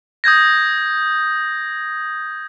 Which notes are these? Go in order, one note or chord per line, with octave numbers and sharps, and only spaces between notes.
D#6 G6 G#6 A#6